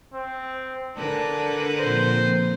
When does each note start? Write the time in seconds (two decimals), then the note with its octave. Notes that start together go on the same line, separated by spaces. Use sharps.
0.13 C4
0.97 D3 D4 A#4 B4 G#5
1.79 A#2 F3 C4 C5